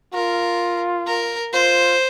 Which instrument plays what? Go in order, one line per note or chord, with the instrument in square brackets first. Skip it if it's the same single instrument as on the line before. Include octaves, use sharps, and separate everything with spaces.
[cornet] F4 [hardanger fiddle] A#4
[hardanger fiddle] A#4
[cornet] F4 [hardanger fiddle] C5